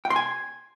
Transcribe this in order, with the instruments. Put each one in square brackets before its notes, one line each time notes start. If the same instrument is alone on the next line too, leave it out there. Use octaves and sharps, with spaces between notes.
[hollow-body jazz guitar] G5
C6
G#5